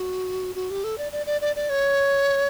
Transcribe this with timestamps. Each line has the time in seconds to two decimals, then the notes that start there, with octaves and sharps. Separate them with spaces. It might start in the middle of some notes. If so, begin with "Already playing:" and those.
Already playing: F#4
0.55 F#4
0.70 G4
0.84 A4
0.98 D5
1.12 D5
1.26 D5
1.41 D5
1.56 D5
1.70 C#5